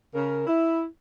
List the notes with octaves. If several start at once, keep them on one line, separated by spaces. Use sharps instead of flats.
C#3 A#4
E4